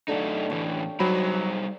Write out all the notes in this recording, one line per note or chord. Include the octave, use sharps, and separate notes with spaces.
F#2 D3 A3 D#4 G4 F5
A2 D3 E3 C#5 D5 G5
F#3 G3 D#4 C5 B5